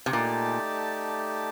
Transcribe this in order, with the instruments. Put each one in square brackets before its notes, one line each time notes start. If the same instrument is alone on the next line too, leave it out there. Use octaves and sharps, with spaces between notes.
[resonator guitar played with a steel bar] C3
[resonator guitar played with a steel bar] A#2 [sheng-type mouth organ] A3 D#4 G4 D5 A5